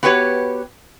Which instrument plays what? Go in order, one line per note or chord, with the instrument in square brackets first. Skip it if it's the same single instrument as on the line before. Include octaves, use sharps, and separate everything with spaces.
[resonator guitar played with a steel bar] B3 F#4 G4 B4 C#5